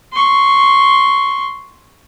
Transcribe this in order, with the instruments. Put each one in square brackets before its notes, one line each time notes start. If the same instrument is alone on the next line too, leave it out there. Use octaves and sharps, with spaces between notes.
[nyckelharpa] C6 C#6